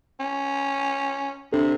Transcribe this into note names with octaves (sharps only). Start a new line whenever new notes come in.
C#4
C3 D4 A4